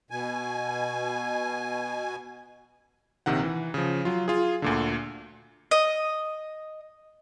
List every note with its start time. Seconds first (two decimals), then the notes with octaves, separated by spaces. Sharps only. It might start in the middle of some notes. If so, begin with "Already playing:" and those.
0.11 B2 G#5
3.26 A#1 C3 D#3 F#5
3.43 E3
3.74 C#3 F3
4.05 F#3 F4
4.28 F4 G#4
4.62 D2 A#2 D3
5.71 D#5